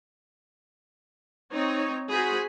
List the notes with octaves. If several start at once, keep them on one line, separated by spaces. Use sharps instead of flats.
C4 D#4 C#5
F#4 G#4 C5 G#5 B5